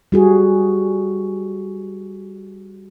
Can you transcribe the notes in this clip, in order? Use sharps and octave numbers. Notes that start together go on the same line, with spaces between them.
G3 F#4 G#4